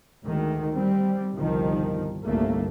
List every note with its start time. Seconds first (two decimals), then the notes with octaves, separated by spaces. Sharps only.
0.24 D2 D#3 G#3
0.74 G3 C4
1.36 G1 C2 D#3 F3
2.24 G1 C2 A3 A#3